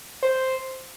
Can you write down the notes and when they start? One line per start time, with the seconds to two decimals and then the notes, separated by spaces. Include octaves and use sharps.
0.23 C5